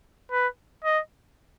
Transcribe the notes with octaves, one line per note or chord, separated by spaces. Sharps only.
B4
D#5